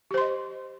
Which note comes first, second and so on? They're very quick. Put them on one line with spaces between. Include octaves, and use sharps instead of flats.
G4 C5 C6 D#5